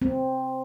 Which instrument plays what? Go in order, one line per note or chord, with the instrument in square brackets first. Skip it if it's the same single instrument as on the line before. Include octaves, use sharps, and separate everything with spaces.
[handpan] C4